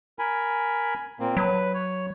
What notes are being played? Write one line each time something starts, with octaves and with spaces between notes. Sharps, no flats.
A#4 G#5 B5
A#2 A#3 C4
F#3 B4
C#5